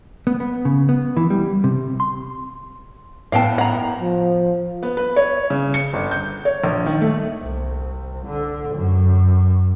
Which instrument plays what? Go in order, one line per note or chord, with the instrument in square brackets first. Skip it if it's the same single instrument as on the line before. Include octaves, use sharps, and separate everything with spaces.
[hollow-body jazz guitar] B3
B3
C#3
B3
E3
G3
C3
C6
[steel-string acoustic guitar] A2 B3 [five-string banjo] F5 G5 A5
[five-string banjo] F#5 A#5
[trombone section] F3
[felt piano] B3
B4
C#5
C#3
C#7
G1
G6
C#5
A#1
D#3
A3
[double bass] C2
D3
F#2